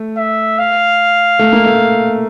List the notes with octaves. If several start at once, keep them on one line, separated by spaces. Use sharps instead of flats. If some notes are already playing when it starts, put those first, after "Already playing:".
Already playing: A3
E5
F5
A3
A#3
A3